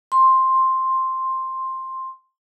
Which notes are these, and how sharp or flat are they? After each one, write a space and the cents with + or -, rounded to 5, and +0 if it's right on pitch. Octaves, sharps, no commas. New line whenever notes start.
C6 +5